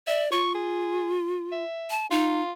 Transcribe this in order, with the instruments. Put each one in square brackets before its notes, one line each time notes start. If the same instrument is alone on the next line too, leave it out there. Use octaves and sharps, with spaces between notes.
[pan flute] D5 [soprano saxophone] E5
[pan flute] F4 [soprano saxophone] C#6
[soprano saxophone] G#4
E5
[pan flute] A5
[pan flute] D#4 [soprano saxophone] F4